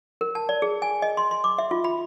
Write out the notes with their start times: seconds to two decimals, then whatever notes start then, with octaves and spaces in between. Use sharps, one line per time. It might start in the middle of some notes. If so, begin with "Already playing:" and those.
0.21 A#4
0.35 A5
0.49 D5
0.62 G#4
0.82 G#5
1.02 D#5
1.17 C6
1.31 C6
1.44 D6
1.58 E5
1.71 F4
1.84 B5